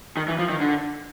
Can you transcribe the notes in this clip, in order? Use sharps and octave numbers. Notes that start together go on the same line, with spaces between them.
D#3
E3
F3
D#3
D3